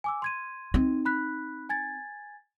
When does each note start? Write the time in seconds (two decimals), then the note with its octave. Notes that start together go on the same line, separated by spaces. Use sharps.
0.04 G#5 D6 E6
0.22 C6 G#6 D#7
0.74 C4 D#4
1.05 B5 F#6 B6
1.69 G#5 G#6 A6